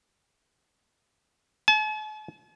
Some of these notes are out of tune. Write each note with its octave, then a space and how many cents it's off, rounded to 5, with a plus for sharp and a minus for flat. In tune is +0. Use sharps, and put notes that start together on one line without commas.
A5 -45